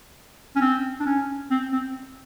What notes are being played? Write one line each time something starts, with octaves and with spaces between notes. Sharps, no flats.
C#4
C4
D4
C#4
C4
C4